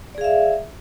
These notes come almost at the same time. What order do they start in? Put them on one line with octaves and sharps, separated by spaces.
D5 G#4 F5 E5